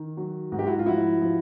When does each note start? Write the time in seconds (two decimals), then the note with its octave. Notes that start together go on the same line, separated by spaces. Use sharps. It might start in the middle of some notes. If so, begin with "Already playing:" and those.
Already playing: D#3
0.17 F#3
0.52 G#2 F#4
0.59 G4
0.67 E4 F#4
0.79 F4
0.86 F3 E4 F#4
1.21 F3